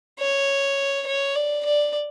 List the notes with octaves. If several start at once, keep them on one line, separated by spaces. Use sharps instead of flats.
C#5
C#5
D5
D5